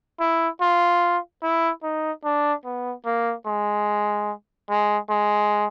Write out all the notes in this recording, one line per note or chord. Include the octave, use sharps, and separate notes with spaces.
E4
F4
E4
D#4
D4
B3
A#3
G#3
G#3
G#3